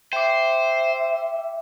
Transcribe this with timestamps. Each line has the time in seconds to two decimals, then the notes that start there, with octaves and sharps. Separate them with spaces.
0.13 C5 E5 G5 D6